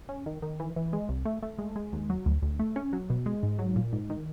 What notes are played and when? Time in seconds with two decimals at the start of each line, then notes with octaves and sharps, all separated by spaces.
0.09 C#4
0.26 D#3
0.42 D#3
0.60 E3
0.76 E3
0.93 G#3
1.09 C2
1.25 A3
1.43 A3
1.59 G#3
1.76 G#3
1.93 D#2
2.10 F#3
2.26 D2
2.42 D2
2.59 A3
2.76 C#4
2.93 F#3
3.10 B2
3.26 G#3
3.43 G#2
3.59 F#3
3.76 A#2
3.93 G#2
4.10 D#3